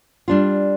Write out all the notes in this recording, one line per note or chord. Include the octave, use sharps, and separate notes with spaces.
G3 D4 F4